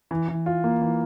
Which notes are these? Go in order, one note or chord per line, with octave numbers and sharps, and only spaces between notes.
E3
E3
F4
A#3
E3